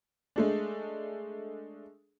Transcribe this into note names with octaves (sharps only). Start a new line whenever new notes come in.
G#3 A3 D4